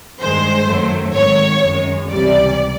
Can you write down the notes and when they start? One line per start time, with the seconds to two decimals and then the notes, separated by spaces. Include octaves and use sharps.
0.20 G2 D#3 G#3 C5
0.68 F#2 D#3 F#3 A3
1.15 G#1 G#2 D#3 C#5
1.63 F#2 D#3 G#3
2.10 C#2 C3 E3 G3 D5